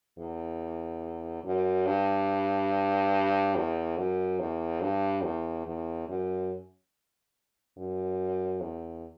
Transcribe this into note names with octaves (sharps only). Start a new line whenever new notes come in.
E2
F#2
G2
E2
F#2
E2
G2
E2
E2
F#2
F#2
E2